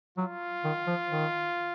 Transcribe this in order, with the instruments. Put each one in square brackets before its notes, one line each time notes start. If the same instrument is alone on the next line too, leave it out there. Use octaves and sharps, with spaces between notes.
[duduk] F#3 [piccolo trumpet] F4
[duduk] D#3
F3
D#3